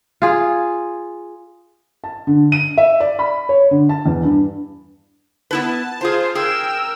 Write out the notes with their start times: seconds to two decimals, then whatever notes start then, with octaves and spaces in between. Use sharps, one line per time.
0.22 F4 G#4
2.04 A5
2.27 D3
2.52 D#7
2.78 E5
3.00 D5
3.19 B5
3.49 C#5
3.71 D3
3.89 A5
4.06 E2
4.24 G2
5.51 B3 E4 B4 A5
6.01 F4 G#4 C5 A5
6.35 G#4 A#4 G5 E6